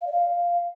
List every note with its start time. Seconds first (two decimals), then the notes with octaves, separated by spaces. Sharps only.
0.01 F5
0.07 D5
0.12 F5